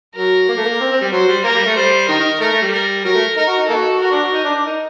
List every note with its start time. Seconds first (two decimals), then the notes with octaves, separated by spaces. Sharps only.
0.16 F#3 A#4
0.49 A#3
0.57 A3
0.64 A#3
0.81 C4
0.91 C4
1.01 G3
1.12 F#3 C5
1.28 G3
1.44 A#3 A#4
1.55 G3
1.66 A3
1.76 G3 C5
2.08 D#3 A#4
2.20 D#3
2.40 A3 A#4
2.52 A3
2.62 G3
2.73 A#4
3.04 F#3 A#4
3.15 A3
3.37 D#4 A#4
3.47 F#4
3.58 D#4
3.68 A#3 D#4 F#4 A4
4.01 F#4 A#4
4.11 D4
4.23 F#4
4.33 D#4
4.44 D4
4.55 D4
4.66 D#4